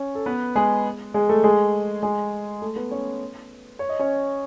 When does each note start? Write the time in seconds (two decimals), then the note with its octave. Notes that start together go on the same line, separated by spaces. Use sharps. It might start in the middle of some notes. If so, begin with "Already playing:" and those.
Already playing: C#4 C#5
0.15 A4
0.26 B3 B4
0.55 G#3 G#4
1.14 G#3 G#4
1.29 A3 A4
1.44 G#3 G#4
2.03 G#3 G#4
2.62 A3 A4
2.76 B3 B4
2.91 C#4 C#5
3.79 C#5
3.89 D#5
3.99 C#4 C#5